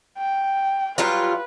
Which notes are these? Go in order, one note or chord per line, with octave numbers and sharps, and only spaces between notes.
G5
F#3 G3 F4 B4